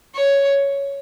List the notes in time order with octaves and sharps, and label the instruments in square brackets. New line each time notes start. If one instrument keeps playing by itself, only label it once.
[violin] C#5